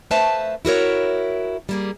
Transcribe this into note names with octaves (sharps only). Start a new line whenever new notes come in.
A3 B4 C5 E5 F5 A5
E4 F#4 A#4 C#5
G3 A#3 G#4